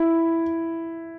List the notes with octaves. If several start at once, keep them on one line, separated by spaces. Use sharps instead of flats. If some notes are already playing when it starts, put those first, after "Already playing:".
Already playing: E4